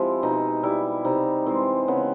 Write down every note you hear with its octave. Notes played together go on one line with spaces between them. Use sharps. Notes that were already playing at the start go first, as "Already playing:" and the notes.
Already playing: C3 F3 G#3 E4
B2 D#4
G3 E4
C3 D#4
E3 G#3 C4
C#3 B3